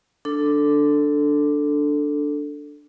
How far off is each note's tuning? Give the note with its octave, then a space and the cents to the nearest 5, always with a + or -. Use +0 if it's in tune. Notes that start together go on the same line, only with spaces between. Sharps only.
D4 +0 A4 +5